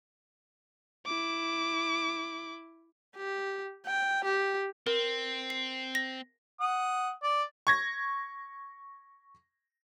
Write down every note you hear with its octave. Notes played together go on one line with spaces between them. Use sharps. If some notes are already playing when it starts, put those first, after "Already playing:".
E4 D6
G4
G5
G4
C4 A#4
C7
A#6
F#5 D#6
D5
C#6 G#6 A#6